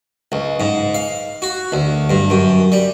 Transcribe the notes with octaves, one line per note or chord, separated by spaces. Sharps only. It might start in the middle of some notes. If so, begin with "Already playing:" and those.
C#2
G#2
F5
F#4
D2
G2
F#2
G3